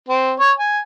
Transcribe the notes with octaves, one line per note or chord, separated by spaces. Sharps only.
C4
C#5
G#5